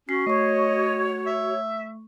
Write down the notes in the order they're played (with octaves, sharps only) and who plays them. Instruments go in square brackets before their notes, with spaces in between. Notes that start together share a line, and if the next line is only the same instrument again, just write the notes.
[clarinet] C#4 [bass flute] F#4 [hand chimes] C7
[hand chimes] A3 C#6 [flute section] C#5 [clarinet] D#5
[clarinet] E5